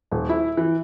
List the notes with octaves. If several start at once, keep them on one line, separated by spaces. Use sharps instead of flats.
D#1
E4
E3